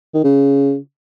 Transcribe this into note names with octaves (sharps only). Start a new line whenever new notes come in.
D#3
C#3